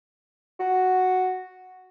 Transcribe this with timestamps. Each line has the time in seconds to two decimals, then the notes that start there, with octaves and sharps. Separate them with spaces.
0.60 F#4